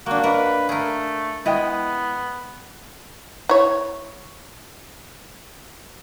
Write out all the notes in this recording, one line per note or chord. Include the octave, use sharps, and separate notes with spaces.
A#3 D4 F#4
D4 A#4 B4 D#5 F#5
A3 G#4 A#4
G#3 B3 E4 D#5 G5
E4 C#5